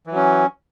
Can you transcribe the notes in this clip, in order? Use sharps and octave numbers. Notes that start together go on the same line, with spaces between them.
E3 F#3 C#4